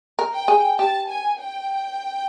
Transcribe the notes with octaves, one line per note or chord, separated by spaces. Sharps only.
A#4
G5
G#4
G4 A5
G#5
G5